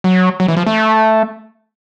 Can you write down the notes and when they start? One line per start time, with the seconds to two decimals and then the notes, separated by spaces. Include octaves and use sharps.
0.04 F#3
0.40 F#3
0.48 E3
0.57 F3
0.67 A3